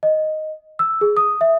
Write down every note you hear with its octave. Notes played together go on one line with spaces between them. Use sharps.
D#5
E6
G#4
D#6
E5